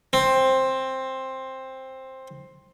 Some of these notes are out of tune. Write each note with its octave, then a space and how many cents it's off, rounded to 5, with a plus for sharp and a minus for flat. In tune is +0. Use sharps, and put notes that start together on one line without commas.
C4 +10